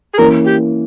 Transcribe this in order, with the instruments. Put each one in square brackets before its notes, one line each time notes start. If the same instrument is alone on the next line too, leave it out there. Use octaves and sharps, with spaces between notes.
[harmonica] G#4
[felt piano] E3 A#3 C#4 [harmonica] A#4
[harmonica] G4